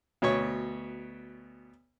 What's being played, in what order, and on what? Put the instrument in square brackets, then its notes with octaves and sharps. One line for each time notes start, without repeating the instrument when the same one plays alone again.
[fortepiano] D2 B2 C#5 C#6